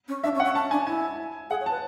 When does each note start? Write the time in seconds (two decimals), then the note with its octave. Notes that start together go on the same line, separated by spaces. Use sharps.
0.08 C#4
0.23 D4 E5
0.35 C#4
0.40 F#5
0.45 C#4
0.55 C#4 A5
0.71 D4 G#5
0.87 E4 G#5
1.50 G#4 F#5
1.61 C#5
1.66 B4 A5